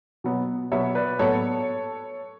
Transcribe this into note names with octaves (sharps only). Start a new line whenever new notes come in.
B2 F#3 B3
B2 F#3 B3 C#5 E5
B4 D5
A2 F#3 B3 A4 C#5